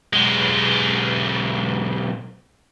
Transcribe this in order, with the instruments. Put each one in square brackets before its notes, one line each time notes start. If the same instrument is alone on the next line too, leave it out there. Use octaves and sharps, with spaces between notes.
[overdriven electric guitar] B1 G#3